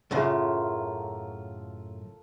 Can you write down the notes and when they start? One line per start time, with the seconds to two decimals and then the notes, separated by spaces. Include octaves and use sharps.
0.11 F#2 A2 C#3 F4 A4 A#4